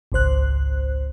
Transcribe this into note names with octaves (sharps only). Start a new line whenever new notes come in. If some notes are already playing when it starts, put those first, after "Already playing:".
G#1 C#2 C5 F#6